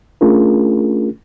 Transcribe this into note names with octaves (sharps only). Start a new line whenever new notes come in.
A3 C#4 D4 F4 G#4 A#4